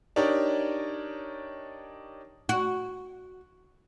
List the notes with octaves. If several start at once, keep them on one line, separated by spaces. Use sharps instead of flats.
D4 D#4 G4 A#4 C#5 D5
F#4